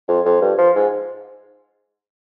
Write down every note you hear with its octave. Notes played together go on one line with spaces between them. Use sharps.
F2
F2
G2
F3
G#2